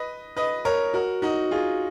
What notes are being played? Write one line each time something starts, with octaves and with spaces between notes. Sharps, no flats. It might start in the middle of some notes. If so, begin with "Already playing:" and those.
Already playing: B4 D#5
B4 D#5
A#4 C#5
F#4 A#4
D#4 F#4
F4 G#4